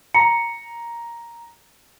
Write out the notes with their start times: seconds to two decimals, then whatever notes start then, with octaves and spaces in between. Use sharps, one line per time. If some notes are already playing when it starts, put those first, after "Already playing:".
0.14 A#5 C#7